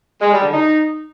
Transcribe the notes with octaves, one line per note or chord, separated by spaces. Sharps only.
G#3
G3
D3
D#4